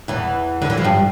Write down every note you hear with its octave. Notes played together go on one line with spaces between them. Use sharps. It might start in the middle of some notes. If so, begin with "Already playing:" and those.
E2 E3
D3
E3
F3
G2 G3